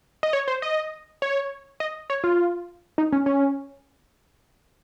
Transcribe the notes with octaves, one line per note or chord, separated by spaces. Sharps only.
D#5
C#5
C5
D#5
C#5
D#5
C#5
F4
D#4
C#4
C#4